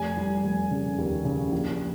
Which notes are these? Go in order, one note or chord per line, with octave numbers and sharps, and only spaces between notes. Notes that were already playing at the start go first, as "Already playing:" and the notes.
Already playing: F1 G#5
G3
F1
C#3
D#2
C#3
A#1